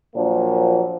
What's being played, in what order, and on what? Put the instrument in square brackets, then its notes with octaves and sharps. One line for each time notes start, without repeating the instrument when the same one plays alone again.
[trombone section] A#2 F3 F#3 A#3 D4